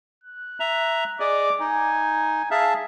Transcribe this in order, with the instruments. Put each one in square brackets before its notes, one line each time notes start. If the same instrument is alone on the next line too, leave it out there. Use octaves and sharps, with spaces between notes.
[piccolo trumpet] F#6
[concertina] E5 A#5
[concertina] G#4 D5 D#5 [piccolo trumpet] D6
[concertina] D#4 [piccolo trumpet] G#5
[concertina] G#4 E5 A5 [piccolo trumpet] F5